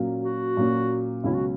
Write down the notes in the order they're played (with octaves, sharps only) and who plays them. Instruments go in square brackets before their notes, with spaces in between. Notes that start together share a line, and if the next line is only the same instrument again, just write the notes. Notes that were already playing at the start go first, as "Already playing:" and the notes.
Already playing: [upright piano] A#2 F#3 A#3 C#4
[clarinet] F#4
[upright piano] A#2 F#3 A#3 C#4
[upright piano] C#2 B2 F#3 C#4 [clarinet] E4
[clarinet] F#4